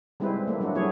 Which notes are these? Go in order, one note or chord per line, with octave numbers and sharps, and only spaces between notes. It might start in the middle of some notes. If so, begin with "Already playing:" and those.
G3 G#3 C4 E4 B4 C5
A3 A#3
F#3 A3 D4 F#4
F#3 G3 A3 E4 G#4 C#5